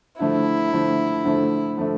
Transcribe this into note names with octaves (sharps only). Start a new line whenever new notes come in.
D3 F3 A3 E4
D3 F3 A3
D3 F3 A3
D3 F3 A3